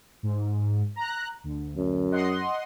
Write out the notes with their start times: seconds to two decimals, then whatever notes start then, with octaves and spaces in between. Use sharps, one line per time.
0.23 G#2
0.96 A#5 F#6
1.44 D2
1.77 F#2
2.11 D#5 F#5 C6